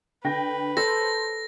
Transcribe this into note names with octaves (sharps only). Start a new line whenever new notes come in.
D3 B4 G5 A#6
A4 C5 A#6